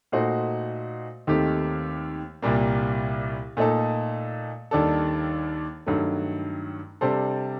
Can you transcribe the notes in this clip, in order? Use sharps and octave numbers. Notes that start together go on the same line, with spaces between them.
A#2 A3 D#4 F#4 C5
D#2 D#3 A3 C4 G4
C2 A#2 G3 A#3
A#2 A3 D#4 A4
D#2 D#3 G3 D4 A4
G2 D#3 F#3 A3
C3 G3 D4 A4 C5